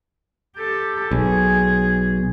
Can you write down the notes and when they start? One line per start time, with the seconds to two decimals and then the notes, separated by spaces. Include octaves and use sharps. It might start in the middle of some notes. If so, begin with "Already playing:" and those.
0.56 G4 A4
1.11 B1 G#4